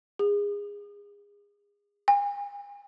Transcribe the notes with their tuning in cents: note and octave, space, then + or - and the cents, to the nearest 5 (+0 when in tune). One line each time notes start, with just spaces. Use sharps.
G#4 -25
G#5 -40